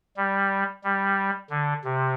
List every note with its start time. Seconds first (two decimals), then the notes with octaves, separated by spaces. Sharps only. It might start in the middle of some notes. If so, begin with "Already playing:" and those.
0.17 G3
0.84 G3
1.50 D3
1.84 C3